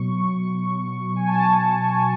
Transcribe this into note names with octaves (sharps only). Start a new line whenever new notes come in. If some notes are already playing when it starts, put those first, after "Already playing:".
Already playing: B2 F#3 C#6
G#5
A5